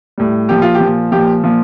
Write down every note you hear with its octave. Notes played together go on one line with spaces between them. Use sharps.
A2 G3
A#2 F3 G4
F4
G4
A#2 F3
A#2 F3 G4
A#2 F3